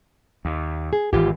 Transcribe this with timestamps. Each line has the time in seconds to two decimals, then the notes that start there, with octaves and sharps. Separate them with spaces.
0.45 D#2
0.93 G#4
1.13 G#1 E3 F4 G4